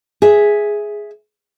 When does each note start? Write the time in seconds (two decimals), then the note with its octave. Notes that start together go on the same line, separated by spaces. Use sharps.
0.22 G#4 E5